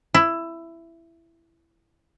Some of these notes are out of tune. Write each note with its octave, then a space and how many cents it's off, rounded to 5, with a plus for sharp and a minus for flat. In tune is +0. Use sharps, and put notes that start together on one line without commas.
E4 +15